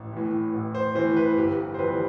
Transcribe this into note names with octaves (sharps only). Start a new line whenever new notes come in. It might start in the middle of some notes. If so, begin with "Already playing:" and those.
Already playing: A1
A2 E3
A1
C5
A2 E3 C5
B4
G1 G4
C5
F2 E3 G3 B4